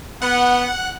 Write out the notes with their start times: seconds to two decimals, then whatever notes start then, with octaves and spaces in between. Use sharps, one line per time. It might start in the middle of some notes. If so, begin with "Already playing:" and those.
0.22 B3 F#5